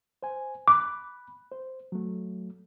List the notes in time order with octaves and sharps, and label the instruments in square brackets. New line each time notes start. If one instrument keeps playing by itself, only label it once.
[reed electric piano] C5 G#5
[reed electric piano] B5 F#6 [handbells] D6
[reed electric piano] C5
F#3 A3